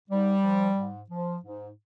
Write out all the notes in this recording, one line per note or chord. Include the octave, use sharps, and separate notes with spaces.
G#2 G3
F3
G#2
F3
G#2